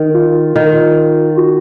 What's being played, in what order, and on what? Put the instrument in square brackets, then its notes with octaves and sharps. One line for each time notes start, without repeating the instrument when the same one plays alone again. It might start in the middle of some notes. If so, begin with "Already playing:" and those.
Already playing: [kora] D#3
[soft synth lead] F4
[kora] D#3
[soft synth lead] F#4